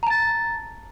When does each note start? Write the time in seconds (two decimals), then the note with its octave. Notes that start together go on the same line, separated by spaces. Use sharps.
0.03 A#5
0.07 A5
0.10 A6